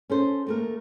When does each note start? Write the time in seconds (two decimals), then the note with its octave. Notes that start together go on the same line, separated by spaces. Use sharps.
0.10 C#4 A4 C5
0.47 D#2 A3 A#4